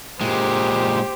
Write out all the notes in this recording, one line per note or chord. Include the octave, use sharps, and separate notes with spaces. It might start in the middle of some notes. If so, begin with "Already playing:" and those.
A#2 G#3 G4 C5